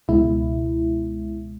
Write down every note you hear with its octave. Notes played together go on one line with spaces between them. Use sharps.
C#2 B2 G#3 E4